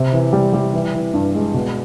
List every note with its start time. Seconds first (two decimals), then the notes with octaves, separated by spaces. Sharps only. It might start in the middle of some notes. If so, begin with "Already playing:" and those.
Already playing: C3
0.13 E3
0.33 G3
0.53 G3
0.73 E3
0.94 E3
1.14 G2
1.35 G#3
1.54 B2